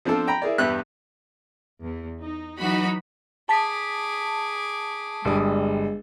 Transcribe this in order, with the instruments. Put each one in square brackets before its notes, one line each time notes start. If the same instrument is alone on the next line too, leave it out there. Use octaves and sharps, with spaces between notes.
[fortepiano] F3 C4 D4 F4 A4
G5 A#5 B5
E4 G#4 A#4 D5
E2 G2 G4 B4 E5 F#6
[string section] E2
D#4
E3 F#3 D#4 F#4 B5
[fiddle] G#4 D6 [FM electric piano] A5 B6
[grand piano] G1 G3 D#6 [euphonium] G#3